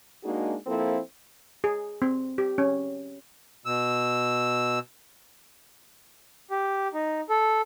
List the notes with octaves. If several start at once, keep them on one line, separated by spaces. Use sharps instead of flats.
G#3 A#3 D4 D#4 F#4 G#4
F3 A#3 C4 E4 F4 A4
G#4
C4
G4
C#4
B2 E6
G4
D#4
A4